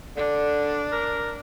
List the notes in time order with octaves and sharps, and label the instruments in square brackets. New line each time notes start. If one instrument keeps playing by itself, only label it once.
[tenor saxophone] D3 [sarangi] D4
[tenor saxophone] A#4